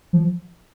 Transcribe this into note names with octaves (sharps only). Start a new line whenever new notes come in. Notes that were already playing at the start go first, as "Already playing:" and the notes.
F3